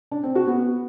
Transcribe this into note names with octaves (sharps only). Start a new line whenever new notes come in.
D4
C4
F#4
B3